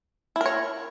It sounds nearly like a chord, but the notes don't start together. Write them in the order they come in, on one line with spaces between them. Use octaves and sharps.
E4 A#4 C#5